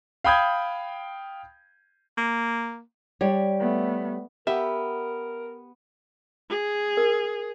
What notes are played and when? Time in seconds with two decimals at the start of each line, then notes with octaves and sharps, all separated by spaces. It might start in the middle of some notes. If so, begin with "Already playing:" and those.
0.24 F5 G5 B5 D#6 G6 G#6
2.18 A#3
3.21 G3 G4 C#5
3.59 A3 B3
4.47 B3 G4 A#4 E5
6.50 G#4
6.97 A#4